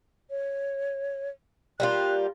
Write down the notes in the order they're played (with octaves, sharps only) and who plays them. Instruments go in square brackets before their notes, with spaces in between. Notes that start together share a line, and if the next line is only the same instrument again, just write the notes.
[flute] C#5
[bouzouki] G3 A#3 F4 [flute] F#6